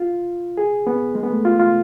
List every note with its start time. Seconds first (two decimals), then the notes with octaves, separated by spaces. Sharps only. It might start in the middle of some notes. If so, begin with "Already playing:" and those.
Already playing: F4
0.57 G#4
0.87 B3
1.15 G#3
1.23 B3
1.30 A3
1.45 F4
1.59 F4